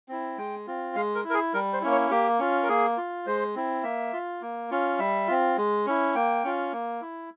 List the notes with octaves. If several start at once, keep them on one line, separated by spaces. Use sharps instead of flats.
C4 E4
G#3 G5
C4 F4
G#3 F5
A#4
E4
A#4
G#4
G3 A#4
C5
A#3 C#4 E4
C#5
A#3 G4
C#4 F4
A#4
A#3 G#4
F4
G#3 C5
C4 E4
A#3 E5
F4
A#3
C#4 F4
G3 E5
C4 F4
G#3
C#4 E4
A#3 G5
C#4 F4
A#3
E4